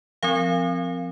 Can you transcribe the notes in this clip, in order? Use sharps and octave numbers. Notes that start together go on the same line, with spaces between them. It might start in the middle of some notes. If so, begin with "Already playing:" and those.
F3 C4 F5